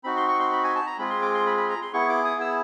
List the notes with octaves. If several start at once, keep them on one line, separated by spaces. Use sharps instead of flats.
C4 D#4 F#4 B5
C6
C#6
C6
B5
G#5
A5
A#5
G#3 C4 F4 G#4 B5
C6
D6
C6
B5
B5
A#5
C6
B3 E4 G#4 C#6
D6
D#6
E6